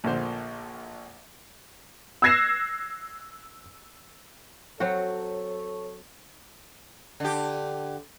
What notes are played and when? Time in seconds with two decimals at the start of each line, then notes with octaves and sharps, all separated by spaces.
0.04 A#1 A#2 D3 C5
2.22 E6 F#6 G#6 A#6 C7 E7
4.80 F#3 C4 F#4 A4 C#5
7.20 D3 G4